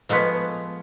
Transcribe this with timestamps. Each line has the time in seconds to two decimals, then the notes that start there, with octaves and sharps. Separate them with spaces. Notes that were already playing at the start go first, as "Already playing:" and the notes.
0.09 F3 G#3 A3 B3